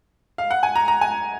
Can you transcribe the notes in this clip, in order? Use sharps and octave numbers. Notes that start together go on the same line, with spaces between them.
F5
F#5
G#5
A#5
A#5
G#5